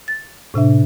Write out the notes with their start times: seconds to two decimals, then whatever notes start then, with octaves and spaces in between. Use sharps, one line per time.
0.08 A6
0.54 A2 C3 D4 E5